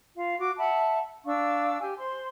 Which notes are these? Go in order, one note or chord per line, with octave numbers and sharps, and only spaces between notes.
F4 F5
F#4 D6
E5 F#5 A5 B5
D4 F5 C#6 E6
G4 G#5
C5 C6